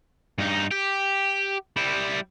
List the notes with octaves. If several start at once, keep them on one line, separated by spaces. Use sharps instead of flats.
G2 D#4
G4
G3 E4